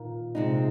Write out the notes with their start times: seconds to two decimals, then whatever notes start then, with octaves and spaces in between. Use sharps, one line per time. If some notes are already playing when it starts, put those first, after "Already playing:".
Already playing: A#2 D#3
0.35 C3 G#3 D#4